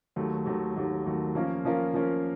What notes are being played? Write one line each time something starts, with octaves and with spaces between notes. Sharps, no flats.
D#2 D#3 F#3 A3
D#2 D#3 F#3 A3
D#2 D#3 F#3 A3
D#2 D#3 F#3 A3
F3 A#3 C#4 F4 A#4
F3 A#3 C#4 F4 A#4
F3 A#3 C#4 F4 A#4